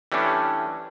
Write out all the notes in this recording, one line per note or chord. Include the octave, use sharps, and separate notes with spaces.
E3 G3 A3 C#4 D4